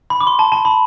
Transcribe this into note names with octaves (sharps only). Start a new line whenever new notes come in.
B5
D6
C6
A5
A5
B5